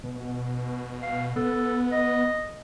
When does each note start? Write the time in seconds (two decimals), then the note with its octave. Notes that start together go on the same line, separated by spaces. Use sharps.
0.04 B2
1.03 F5
1.36 B3 A4
1.92 D#5